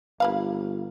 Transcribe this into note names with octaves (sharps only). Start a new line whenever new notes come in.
G1 A#3 B4 F5